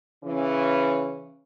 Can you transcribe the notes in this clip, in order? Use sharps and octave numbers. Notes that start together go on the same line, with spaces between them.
C#3 E3 C#4